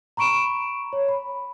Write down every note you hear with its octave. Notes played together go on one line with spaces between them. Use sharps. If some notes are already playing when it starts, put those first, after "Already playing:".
A#5 B5 C#6 D7 E7
C#5
B5